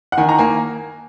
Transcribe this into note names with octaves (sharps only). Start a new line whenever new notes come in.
F#5
D#3 G#5
A#5
A#3 G#5